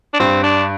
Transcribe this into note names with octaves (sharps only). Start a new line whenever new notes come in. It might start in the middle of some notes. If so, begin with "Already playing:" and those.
D4
G2 C4
D4